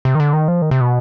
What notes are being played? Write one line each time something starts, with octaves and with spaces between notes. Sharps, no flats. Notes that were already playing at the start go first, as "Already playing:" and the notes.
C3
D#3
D3
D#3
F3
D#3
C3
B2